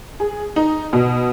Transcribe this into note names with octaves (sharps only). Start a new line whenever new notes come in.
G#4
D#4
B2